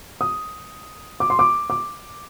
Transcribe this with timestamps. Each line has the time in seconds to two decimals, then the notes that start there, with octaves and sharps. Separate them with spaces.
0.21 D#6
1.20 D6
1.30 C6
1.39 D6
1.70 D6